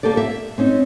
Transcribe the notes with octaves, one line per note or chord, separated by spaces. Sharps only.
A#3 G4 A4 D5
E5
C4 C#4 D#4